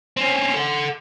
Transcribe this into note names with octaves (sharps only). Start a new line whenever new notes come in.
C4 C#4
A4 F#5